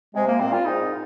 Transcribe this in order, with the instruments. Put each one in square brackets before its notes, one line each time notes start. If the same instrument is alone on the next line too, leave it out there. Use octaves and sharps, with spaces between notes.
[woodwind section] C3 [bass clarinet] G#3
[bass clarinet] A#3
[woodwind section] A#2 [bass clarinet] C4
[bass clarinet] F4
[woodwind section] G#2 [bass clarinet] D#4